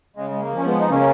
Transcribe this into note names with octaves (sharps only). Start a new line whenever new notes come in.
C#3 G#3
G#3
A#3
F3 C#4
G#3 B3
D#4
C#3 A#3 C#4